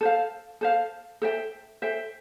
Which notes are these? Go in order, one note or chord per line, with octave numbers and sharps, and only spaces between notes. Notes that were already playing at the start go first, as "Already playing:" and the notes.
A4 C5 F5
A4 C5 F5
A4 C5 E5 G5
A4 C5 E5 G5